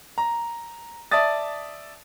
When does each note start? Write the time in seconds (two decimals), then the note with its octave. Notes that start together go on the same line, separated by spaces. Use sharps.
0.18 A#5
1.11 D5 E5 A5 D#6 A6